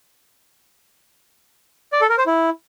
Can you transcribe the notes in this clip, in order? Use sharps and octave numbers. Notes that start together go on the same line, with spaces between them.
D5
A4
A#4
C5
E4